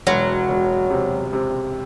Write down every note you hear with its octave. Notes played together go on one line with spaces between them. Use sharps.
E1 F#3
E1
C3
C3